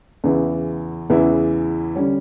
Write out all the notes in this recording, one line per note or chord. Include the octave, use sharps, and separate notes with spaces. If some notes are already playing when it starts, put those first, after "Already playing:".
E2 C#3 E3 B3 E4
E2 C#3 E3 B3 E4
D3 G3 C#4